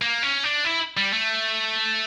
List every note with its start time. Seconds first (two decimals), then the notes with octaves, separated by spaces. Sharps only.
0.02 A#3
0.23 C#4
0.44 D4
0.65 E4
0.97 G3
1.13 A3